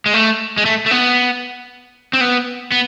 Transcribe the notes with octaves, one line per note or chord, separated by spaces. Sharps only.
G#3
A3
G#3
A3
A3
B3
C4
B3
B3